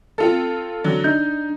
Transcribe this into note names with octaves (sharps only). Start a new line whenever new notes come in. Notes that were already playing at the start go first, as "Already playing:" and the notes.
C4 F4 A4
D3 F#3
D4 D#4 G6